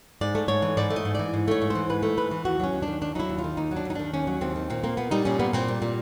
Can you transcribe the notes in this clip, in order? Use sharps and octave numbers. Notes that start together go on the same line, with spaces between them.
G#2 D5
A3
G#2 C#5
E3
G#2 D5
A3
D#5
G#2
E3 D5
G#2
A3 C#5
G#2
E3 C5
G#2 B4
A3
G#2 B4
E3
D#2 F#4
F#3 C#4
D#2
D4
D#3
D#2 D4
F#3 D#4 E4
D#2
F4
D#3
D#2 D#4
F#3
D4
D#2 D#4
D#3 D4
D#2 C#4
F#3
D#2 C4
D#3
A#2 C4
A#3 C4
A#2 B3
G3 D#4
A#2 C#4
A#3 B3
A#2 C4
G3
A#2